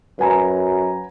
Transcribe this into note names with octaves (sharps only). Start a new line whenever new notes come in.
F#2 B4 G#5 A#5